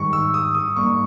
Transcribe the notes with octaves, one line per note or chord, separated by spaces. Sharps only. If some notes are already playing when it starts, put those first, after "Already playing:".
Already playing: G#2 D#3 G3 C#6
E6
D#6
D#6
G#2 G3 A#3 C#6